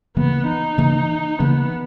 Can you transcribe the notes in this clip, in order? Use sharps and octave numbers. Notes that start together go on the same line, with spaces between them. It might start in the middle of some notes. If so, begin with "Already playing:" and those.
C#3 E3 A#3 B3
D#4
C#3 E3 A#3
C#3 E3 A#3 B3